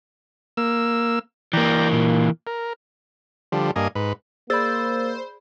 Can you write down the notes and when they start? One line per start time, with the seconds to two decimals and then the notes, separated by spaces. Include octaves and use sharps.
0.57 A#3 E6
1.53 E3 A#3 D5 G5 A#5
1.92 A#2
2.47 A#4
3.52 D3 F3 G3
3.76 G2 A#3 D#5 G#5
3.95 G#2 B4
4.50 A#3 G#4 C5 D5 B5 E6 A6